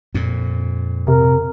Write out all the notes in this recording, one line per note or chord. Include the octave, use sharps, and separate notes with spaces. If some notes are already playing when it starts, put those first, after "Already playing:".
F2 A#2
C3 A#4